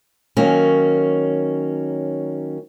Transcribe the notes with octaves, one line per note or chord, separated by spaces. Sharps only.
D#3 F#3 A#3 C#4